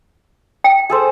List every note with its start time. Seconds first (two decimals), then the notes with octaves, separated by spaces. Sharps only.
0.64 G5
0.90 G#4 A4 C5